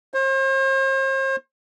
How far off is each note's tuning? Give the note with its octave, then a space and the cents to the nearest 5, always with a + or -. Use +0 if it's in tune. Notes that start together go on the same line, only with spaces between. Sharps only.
C5 +40